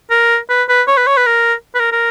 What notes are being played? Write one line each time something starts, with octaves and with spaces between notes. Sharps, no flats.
A#4
B4
B4
C#5
B4
C#5
B4
A#4
B4
A#4
A#4